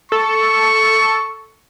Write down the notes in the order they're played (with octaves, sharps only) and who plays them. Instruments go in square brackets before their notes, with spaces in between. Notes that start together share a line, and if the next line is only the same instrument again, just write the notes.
[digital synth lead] A4 [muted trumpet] C#6